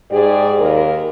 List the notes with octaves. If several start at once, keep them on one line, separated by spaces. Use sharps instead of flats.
G#2 G4 G#4 D5
D#2 A#3 A#4